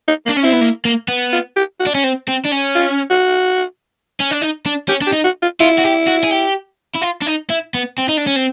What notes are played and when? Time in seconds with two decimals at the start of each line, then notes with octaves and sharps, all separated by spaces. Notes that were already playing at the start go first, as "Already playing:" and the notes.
0.08 D#4
0.26 A#3
0.30 D4
0.37 C#4
0.43 C4 E4
0.53 B3
0.61 A#3
0.85 A#3
1.08 B3
1.33 F4
1.56 G4
1.80 F#4
1.87 D4
1.95 C#4
2.04 C4
2.28 C4
2.45 D4
2.52 C#4
2.75 F4
3.10 F#4
4.20 C#4
4.31 D4
4.42 D#4
4.66 D4
4.88 C#4 G4
5.02 D4
5.07 G4
5.13 D#4
5.24 F#4
5.42 F4
5.60 E4 F4
5.78 F#4
5.84 G4
6.07 F#4
6.23 G#4
6.31 G4
6.95 E4
7.02 F4
7.22 D4
7.27 D#4
7.50 E4
7.74 B3
7.98 C4
8.09 D#4
8.17 D4
8.27 C#4
8.36 C4